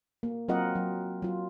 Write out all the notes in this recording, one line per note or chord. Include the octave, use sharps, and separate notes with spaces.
A#3
F#3 C4 F4 A#4 D#5 F#5
F#3
F#3 F4